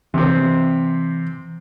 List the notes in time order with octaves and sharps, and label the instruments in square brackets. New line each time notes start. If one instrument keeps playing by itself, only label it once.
[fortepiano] C3 C4 [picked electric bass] E3